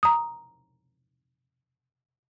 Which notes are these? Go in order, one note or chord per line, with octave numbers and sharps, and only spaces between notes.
A#5 D#6